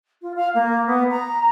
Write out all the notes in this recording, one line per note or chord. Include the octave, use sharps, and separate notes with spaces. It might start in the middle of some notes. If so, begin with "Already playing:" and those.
F4
F5
A#3
B3
A#5